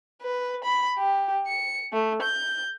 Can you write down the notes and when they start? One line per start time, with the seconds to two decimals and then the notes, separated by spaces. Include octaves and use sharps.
0.22 B4
0.64 B5
0.98 G4
1.47 C#7
1.93 A3
2.22 G6